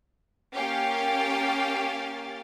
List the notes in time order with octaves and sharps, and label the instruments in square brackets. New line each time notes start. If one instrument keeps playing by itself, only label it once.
[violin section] A#3 C#4 G4 F5 G5 A6